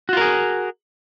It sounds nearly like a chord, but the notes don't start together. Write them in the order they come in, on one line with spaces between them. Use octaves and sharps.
F#4 F4 A#4 G#4